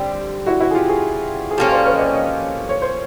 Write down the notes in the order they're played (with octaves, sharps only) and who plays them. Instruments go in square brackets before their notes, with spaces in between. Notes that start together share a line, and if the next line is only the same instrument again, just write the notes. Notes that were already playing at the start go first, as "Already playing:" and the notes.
Already playing: [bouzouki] D3 G3 C4 [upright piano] G4
[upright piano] E4 F#4
E4 F#4
G#4
F4 G4
F#4 G#4
G#4
[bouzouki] F3 A#3 C#4 [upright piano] G4 A4
[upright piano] C5 D5
B4 C#5
D#5
C5 D5
C#5 D#5
C#5
C5